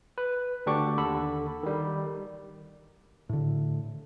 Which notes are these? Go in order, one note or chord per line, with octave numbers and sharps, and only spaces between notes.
B4
D2 D3 D4 G4 C#6 D6
D#2 D3 A4 B5
D#3 G3
A2 D3